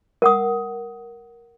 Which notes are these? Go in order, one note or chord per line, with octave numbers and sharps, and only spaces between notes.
A#4 F#5 D#6